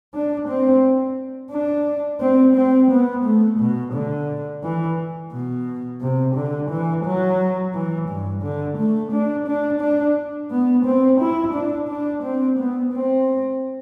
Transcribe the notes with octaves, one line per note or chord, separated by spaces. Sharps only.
D4
C4
D4
C4
C4
B3
A3
B2
D3
E3
B2
C3
D3
E3
F#3
E3
G2
D3
A3
D4
D4
D4
B3
C4
E4
D4
D4
C4
B3
C4